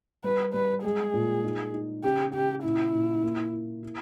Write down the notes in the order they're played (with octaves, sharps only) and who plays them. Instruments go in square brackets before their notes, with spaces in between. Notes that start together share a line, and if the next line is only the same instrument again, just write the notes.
[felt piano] G3 [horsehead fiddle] B4
[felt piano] G3 [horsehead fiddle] B4
[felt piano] G#3 [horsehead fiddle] G#4
[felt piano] A#2
D#4
D#4
[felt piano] C#3 [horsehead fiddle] G4
[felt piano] C#3 [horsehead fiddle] G4
[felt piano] A#2 [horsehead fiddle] E4
[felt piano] A#2
A#3
E4
E4